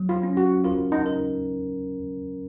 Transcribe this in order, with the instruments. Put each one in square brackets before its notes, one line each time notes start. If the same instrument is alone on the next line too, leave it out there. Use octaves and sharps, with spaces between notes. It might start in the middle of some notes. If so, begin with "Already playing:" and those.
Already playing: [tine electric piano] F#3
[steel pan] F4
[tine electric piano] C#4
[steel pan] F#4
[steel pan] F4 [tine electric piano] A#4
[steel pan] D#4
[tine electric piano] A#4